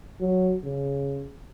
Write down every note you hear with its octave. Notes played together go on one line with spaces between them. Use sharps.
F#3
C#3